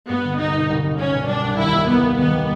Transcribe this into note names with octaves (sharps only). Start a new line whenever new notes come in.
G2 B3
D3
C2 D#4
B2
C2
C2
C2 C#4
B2
G3 D4
C2
D#2 E4
A#3
G3 B3
A#3
D#3 B3
G3